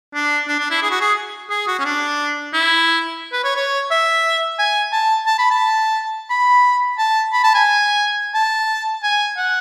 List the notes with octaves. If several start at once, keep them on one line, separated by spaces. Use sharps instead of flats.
D4
D4
D4
E4
G#4
F#4
G#4
G#4
F#4
C#4
D4
E4
B4
C#5
C#5
E5
G#5
A5
A5
B5
A5
B5
A5
B5
A5
G#5
A5
G#5
F#5